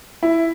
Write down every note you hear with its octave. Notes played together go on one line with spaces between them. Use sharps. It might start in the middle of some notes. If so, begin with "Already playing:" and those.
E4